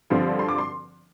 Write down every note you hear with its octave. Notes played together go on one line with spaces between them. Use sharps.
G2 D3 F3 C4 C6
C6
D6
C6